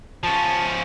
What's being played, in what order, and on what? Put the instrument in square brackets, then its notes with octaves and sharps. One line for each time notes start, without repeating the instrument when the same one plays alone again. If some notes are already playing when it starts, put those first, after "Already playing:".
[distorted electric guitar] F3 C#4 [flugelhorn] A5